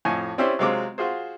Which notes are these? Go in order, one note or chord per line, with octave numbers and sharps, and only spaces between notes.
F2 A2 G#5
C4 C#4 E4 G4 C5 D5
C3 F#3 G#3 C4 F4 D6
F4 F#4 G#4 C5